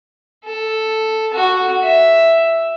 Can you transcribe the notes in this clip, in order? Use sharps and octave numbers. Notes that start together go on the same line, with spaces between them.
A4
F#4
E5